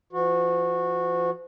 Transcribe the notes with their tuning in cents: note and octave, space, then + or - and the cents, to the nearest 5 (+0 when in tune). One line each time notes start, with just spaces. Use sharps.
F3 -35 F#4 -20